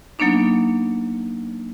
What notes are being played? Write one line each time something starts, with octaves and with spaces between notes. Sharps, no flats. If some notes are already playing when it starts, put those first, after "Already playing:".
F#3 A#3 B3 D4 D#4